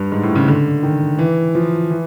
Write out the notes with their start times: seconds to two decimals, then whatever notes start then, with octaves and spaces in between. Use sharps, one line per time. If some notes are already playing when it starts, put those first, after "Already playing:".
Already playing: G2
0.12 G#2
0.23 A2
0.35 C#3
0.48 D3
0.83 D#3
1.19 E3
1.55 F3
1.90 E3